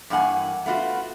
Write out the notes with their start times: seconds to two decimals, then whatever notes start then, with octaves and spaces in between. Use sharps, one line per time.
0.10 G2 E3 A#3 F#5 G#5
0.66 A3 B3 F4 F#4